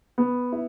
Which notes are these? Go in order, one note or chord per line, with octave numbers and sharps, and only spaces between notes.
B3
E4